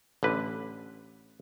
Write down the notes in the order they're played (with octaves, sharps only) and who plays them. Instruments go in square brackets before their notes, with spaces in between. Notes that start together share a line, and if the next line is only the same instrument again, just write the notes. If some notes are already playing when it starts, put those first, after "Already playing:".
[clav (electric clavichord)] A1 D3 B4